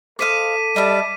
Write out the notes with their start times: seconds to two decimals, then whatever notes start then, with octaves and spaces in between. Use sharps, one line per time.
0.19 A4 C5 D#5 F5 D6 B6 D#7
0.76 G3 D#5 E5 A5